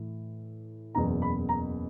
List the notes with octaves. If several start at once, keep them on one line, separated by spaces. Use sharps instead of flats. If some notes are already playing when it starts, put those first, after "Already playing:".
Already playing: A2 E3
F#1 E2 B2 A#5
B5
A#5